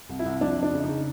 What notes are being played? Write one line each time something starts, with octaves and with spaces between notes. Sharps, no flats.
C2
E4
C2
F2 D4
F2
D4
C#3
D#4
C#3